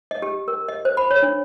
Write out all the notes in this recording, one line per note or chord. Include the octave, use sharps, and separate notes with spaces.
D#5
G4
A#4
D#5
C5
B5
C#5
D4